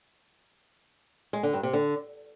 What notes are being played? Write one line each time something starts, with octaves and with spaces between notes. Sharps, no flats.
G#3
D3
G2
C3
D3